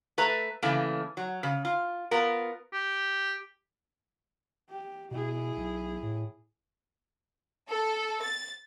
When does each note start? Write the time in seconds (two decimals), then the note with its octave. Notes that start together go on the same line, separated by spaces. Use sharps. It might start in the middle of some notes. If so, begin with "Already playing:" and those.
0.18 A3 B4 E5 A#5
0.62 C#3 E3 A3 A#3
1.17 F#3
1.43 C#3
1.65 F4
2.11 B3 F4 A#4
2.72 G4
4.70 G4
5.11 B2 E4 G#4
5.57 B1
6.03 A2
7.69 A4
8.22 A6